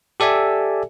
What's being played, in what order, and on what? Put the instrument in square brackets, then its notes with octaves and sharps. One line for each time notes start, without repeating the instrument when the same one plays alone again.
[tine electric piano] G4 A4 D5 E5 G#5